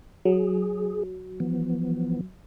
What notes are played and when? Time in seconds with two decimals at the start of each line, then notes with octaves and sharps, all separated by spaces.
0.25 F#3 G#4
1.40 E3 F3 B3